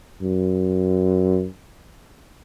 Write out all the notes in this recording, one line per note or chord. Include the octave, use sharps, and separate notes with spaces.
F#2